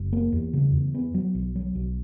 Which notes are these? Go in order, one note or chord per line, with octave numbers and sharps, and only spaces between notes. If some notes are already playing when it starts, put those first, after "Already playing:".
Already playing: F#1
A#3
E2
C#3
E2
B3
F#3
B1
F#3
B1